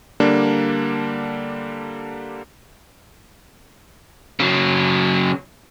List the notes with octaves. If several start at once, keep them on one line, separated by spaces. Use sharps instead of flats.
D3 G3 A#3 D4
C#3 F#3